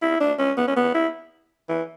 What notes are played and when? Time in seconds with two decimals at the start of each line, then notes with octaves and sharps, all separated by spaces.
0.02 E4
0.20 D4
0.39 C#4
0.57 B3
0.67 C#4
0.76 B3
0.95 E4
1.69 E3